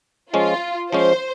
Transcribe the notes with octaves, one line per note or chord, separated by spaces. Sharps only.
F3 G#3 C#4 F4
F3 G#3 C#4 C5